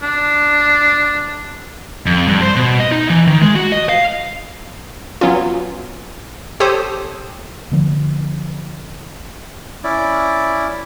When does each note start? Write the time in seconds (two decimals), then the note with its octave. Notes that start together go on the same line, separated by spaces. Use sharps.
0.02 D4
2.06 F2
2.28 G2
2.42 C5
2.56 B2
2.80 D#5
2.92 D#4
3.10 E3
3.27 D#3
3.42 G#3
3.56 F#4
3.72 D#5
3.89 F5
5.21 F#3 B3 C#4 F4
6.60 G4 A4 C5 C#5 D#6
7.72 D3 F3 A#3 B3
9.84 C#4 E4 D5